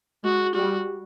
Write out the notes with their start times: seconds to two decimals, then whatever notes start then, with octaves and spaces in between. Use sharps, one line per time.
0.24 G#3 F#4
0.55 G3 F#4